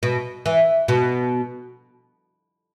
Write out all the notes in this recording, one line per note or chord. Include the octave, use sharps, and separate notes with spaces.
B2
E3
B2